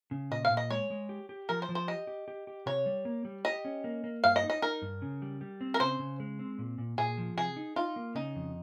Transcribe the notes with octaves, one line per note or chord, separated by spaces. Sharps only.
C#3
A#2 D#5
F5
A#2
D#5
G#3 C#5
G#3
G4
G4
F3 A#4
C5
F3
C5
G4 D#5
G4
G4
G4
C3 C#5
G3
A#3
G3
G4 D#5
C#4
A#3
A#3
G2 F5
D#5
D#4
D#5
D#4 A#4
G2
C#3
G3
G3
C4
A#4
C#3 C5
C#3
G#3
C4
A#2
A#2
A#2 G#4
F3
C3 G#4
D#4
D#4 F4
A#3
C#3 D#4
F2